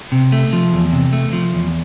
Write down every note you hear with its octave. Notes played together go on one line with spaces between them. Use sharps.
C3
A3
F3
E2
C3
A3
F3
E2